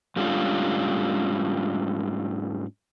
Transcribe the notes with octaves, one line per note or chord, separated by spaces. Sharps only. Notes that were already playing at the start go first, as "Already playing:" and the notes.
G#2 G3 A3 C#4 D4 F4